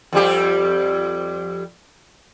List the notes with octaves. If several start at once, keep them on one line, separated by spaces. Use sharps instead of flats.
F2 G3 G4